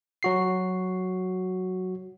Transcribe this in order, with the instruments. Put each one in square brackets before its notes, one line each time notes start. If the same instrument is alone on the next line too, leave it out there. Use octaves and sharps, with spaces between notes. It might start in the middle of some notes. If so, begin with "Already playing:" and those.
[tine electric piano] F#3 F#4 C7